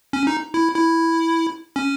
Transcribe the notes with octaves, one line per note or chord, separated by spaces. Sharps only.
C#4
D#4
E4
E4
C#4